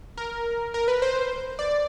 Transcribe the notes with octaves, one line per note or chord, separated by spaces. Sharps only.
A#4
A#4
B4
C5
D5